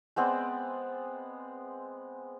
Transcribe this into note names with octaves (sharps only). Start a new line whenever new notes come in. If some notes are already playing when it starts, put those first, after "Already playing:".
G#3 B3 C4 D5